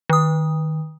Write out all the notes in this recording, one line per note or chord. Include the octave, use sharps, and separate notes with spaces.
D#3 D#6